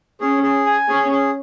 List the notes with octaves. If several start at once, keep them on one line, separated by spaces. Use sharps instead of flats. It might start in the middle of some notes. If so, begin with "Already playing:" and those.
C#4 G#4
G#4
G#5
C#4 G#4
G#4